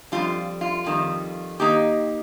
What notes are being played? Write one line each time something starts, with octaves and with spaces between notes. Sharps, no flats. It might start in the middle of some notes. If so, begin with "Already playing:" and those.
F2 D#3 G3 F4
F4
F2 D#3 G3
D#3 A#3 D#4 G4